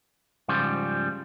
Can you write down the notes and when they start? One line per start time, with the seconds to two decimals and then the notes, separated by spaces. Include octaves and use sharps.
0.48 G#2 C#3 F3 G3